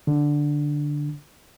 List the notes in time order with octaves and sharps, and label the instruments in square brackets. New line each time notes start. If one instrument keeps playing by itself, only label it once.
[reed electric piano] D3